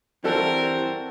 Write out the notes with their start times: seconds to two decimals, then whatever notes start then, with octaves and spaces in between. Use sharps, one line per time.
0.24 G2 E3 G3 C4 F#4 A4 A#4